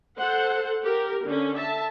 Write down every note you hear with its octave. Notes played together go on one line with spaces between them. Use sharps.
A4 C5 F#5
G4 A#4
D3 C#4
E5 A5